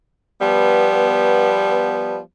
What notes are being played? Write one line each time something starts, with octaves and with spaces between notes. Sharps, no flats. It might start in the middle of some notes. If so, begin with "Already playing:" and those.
F3 G3 B3